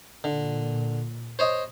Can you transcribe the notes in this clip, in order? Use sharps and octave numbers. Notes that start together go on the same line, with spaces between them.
A#2 D3
C5 C#5 D#5